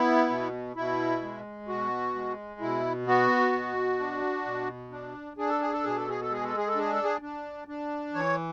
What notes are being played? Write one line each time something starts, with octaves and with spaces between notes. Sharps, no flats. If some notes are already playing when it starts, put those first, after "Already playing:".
Already playing: B3 E4
B2
B2 E4
G#3
B2 F#4
G#3
B2 E4
B3 F#4
B2
D4
B2
D4
D4 G#4
A4
G#4
A4
B2 G#4
A4
G#4
A4
G#3 G#4
A4
G#4
A4
D4 G#4
A4
G#4
D4
D4
E3 C#5